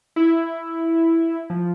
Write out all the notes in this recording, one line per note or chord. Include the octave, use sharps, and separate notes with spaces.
E4
F3